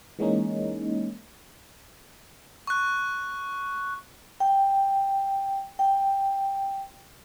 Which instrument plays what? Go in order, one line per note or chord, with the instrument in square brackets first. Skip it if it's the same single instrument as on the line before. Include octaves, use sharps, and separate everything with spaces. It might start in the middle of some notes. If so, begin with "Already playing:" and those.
[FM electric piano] E3 G#3 A#3 C#4 D#4
[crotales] C#6 F#6
[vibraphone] G5
G5